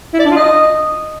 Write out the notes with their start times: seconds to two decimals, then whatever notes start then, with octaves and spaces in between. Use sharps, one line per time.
0.13 E4
0.19 D5
0.25 D4
0.31 F4
0.36 D#5